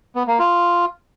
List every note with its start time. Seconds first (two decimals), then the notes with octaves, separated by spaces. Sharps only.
0.15 B3
0.27 A#3
0.39 F4